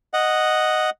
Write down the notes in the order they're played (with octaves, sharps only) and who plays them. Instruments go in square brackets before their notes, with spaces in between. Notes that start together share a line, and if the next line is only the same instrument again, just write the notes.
[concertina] D#5 F#5